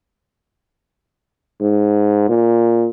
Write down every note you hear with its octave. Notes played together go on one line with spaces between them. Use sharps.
G#2
A#2